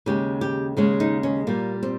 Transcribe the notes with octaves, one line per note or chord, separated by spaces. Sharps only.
D#2 C#3 G#3 G4
G4
D#2 C#3 G#3
D#4
C#4
A#2 G3 A#3
C4